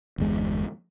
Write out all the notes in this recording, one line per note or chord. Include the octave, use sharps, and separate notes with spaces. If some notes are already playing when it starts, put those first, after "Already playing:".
G1 E2 G#3